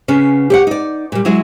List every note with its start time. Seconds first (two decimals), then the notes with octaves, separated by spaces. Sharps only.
0.08 C#3 B3 C#4
0.50 G4 C#5 F#5
0.67 D#4 D5
1.12 A#2 G3
1.25 F#3 G#3 E4 G#4